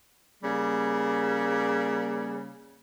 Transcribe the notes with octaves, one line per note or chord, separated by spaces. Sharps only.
C#3 G3 A#3